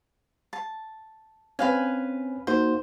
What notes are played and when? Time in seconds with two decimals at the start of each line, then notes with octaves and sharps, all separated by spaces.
0.53 A5
1.59 C4 C#4 B4 F5 G#5
2.47 A#3 D#4 F#4 C5